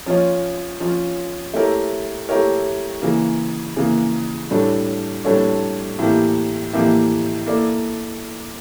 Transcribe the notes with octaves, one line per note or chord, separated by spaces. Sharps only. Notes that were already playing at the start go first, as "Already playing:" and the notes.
F3 C#4 F4 C#5
F3 C#4 F4 C#5
A3 E4 G4 A#4 C#5
A3 E4 G4 A#4 C#5
C#3 E3 A#3
C#3 E3 A#3
A2 G3 D4 A4 C#5
A2 G3 D4 A4 C#5
A2 E3 A#3 E4 G4
A2 E3 A#3 E4 G4
A#3 E4 A4 D5